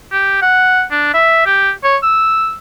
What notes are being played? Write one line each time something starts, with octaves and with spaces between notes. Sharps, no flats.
G4
F#5
D4
E5
G4
C#5
E6